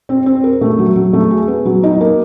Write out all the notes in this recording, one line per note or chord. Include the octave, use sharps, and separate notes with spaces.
C4
C4
A#4
A3
F#3
F#3
A3
G#4
B3
F#3
D#4
A#3